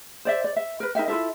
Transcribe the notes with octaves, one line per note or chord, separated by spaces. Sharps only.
C5 D5 E5
D5
E5
A#4 B4
D#4 A#4 E5 G5
E4 F4 A4 E5